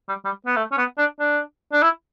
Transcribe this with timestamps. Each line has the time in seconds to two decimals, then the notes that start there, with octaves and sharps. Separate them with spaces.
0.09 G3
0.25 G3
0.46 B3
0.56 A3
0.72 C#4
0.77 B3
0.98 D4
1.20 D4
1.73 D4
1.82 E4